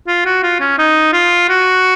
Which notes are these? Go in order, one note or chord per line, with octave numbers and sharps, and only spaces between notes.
F4
F#4
F4
C#4
D#4
F4
F#4